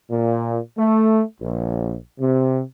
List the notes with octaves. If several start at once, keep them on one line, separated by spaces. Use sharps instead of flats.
A#2
A3
A#1
C3